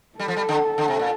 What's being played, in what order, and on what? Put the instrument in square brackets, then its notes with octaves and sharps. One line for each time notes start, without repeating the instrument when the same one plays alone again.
[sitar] G3 [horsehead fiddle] A4
[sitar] F3
G3
D3
D3
C3
A#2